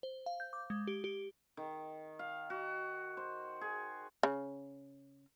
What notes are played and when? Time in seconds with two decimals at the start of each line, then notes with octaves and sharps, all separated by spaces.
0.03 C5
0.26 F5
0.40 G6
0.53 D6
0.70 G#3
0.87 G4
1.04 G4
1.57 D#3
2.19 F5
2.50 F#4
3.17 C5
3.61 G#4
4.23 C#3